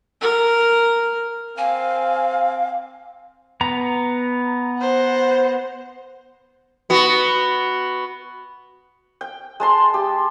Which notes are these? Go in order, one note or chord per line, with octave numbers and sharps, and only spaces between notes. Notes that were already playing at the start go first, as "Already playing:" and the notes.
A#4
C4 F5 G#5
B3 A#5
C5 F#5
B3 F#4
G5
G#3 A5 C6
G4